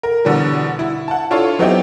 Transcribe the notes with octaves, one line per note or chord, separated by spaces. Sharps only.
A#4
B2 D3 E3 G3
E4
F#5 A5
D4 E4 F4 A4 C#5
F#3 B3 C4 D#4 E4 G4